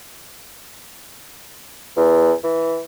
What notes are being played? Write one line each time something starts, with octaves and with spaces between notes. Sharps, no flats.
E2
E3